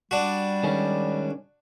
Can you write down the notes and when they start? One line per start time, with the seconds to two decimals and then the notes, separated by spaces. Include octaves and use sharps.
0.11 G3 D4 F#4
0.64 D#3 G#3 C#4